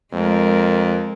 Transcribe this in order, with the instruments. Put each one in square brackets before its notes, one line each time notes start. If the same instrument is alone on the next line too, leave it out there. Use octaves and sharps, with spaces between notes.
[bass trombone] F2 [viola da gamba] G#3 A#4